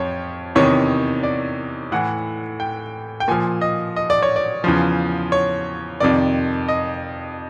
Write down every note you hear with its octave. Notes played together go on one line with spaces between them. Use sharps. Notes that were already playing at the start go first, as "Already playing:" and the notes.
Already playing: F2 F3 C#5
E2 C3 D#3 C#5
D5
A2 E3 F#5
G5
G5
A#2 F3 G#5
D#5
D#5
D5
C#5
D5
E2 C#3 F3
C#5
F2 C3 D#3 D5
D#5